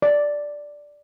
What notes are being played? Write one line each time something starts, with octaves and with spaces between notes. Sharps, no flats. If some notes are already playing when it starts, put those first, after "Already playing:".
D5